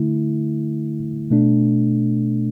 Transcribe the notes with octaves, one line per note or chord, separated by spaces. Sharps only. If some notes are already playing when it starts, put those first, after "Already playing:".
Already playing: D3 A3 E4
B2 A3 D4